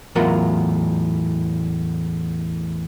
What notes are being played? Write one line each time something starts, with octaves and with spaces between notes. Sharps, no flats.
E2 A2 F#3 F4 A#4 F#5